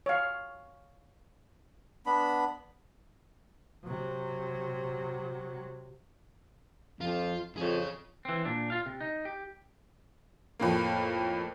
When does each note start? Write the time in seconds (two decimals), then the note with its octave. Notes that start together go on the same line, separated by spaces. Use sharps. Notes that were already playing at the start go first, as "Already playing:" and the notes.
0.06 C#5 F5
2.06 B3 D4 B5
3.85 C3 F#3
7.01 F2 F4
7.57 F2 G#4 C#5
8.25 E3 C4
8.45 A#2 D4
8.70 F4 F5
8.86 C3
9.00 D#4
9.25 G4
10.60 F2 A2 A#3